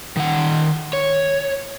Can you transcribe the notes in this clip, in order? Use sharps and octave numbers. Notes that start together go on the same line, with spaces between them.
D#3 F#5
C#5